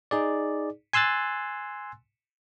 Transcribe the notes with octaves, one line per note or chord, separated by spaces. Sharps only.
D#4 G#4 D5
G#5 C6 E6 F#6 A6